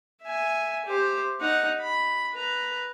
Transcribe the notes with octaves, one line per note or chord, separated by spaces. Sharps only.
E5 G#5
G4 C5
D#4 F#5
B5
B4 A#5